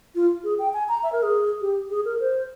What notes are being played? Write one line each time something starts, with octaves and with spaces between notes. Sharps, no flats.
F4
G#4
G5
G#5
A#5
E5
A#4
G#4
G4
G#4
A#4
C5